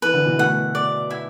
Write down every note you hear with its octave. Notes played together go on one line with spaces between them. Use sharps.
E3 B4
D3
B2 E3
E3 A3 F#5
D5
E4